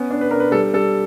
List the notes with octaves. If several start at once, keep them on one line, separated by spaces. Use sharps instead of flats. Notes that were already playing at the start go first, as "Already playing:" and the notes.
Already playing: B3 C#4
D4
B4
D4 A#4
B4
G3 A4
G3 A4